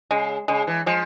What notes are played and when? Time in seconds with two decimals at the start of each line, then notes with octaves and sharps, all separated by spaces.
0.11 C#3 G#3
0.48 C#3 G#3
0.67 E3
0.86 F3 G#3